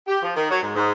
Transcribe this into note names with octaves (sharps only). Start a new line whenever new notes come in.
G4
F3
D#3
F#3
G#2
G#2